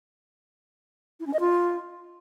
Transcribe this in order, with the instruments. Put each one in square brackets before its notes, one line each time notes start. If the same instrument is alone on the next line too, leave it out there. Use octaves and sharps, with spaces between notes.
[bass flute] E4
C#4
D#5
F4